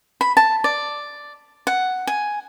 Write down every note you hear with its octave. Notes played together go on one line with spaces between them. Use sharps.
B5
A5
D5
F#5
G#5